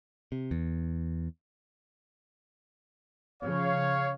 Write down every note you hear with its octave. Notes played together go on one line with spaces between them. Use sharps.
C3
E2
C#3 F3 C#5 F5